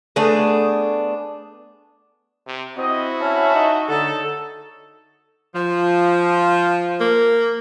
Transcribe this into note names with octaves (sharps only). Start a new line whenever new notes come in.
A3 B3 D4 G#4
C3
C4 E4 F#4 D#5
C#4 E5 A5
D#4
D3 D#4 A4 C#5 D#5
F3
A#3